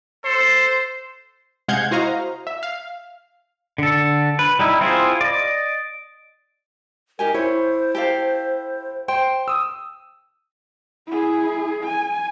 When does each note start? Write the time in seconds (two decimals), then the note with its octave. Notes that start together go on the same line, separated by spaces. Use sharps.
0.25 A4 C5 C7
1.68 C3 G#3 F5 F#5 G6 G#6
1.91 E4 F#4 C5 D#5 F5 A#5
2.47 E5
2.63 F5
3.78 D3 A4
4.39 B4
4.59 G3 D#4 E4
4.81 C4 E4 F4 G#4 C5
5.21 D5 D#5
7.19 D#4 G4 A#4 G#5
7.34 E4 C5 C#5
7.95 G4 A4 F5
9.08 C5 G5 C6
9.48 D#6 E6
11.07 E4 G#4
11.84 G#5